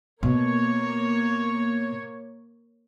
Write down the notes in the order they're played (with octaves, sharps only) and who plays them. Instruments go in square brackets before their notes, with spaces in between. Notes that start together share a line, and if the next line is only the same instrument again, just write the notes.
[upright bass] B2 [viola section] A#3 C#5